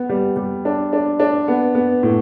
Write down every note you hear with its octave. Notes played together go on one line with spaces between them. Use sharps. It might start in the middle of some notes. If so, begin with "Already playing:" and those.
Already playing: B3
G3
G3
D4
D4
D4
B3
B3
A2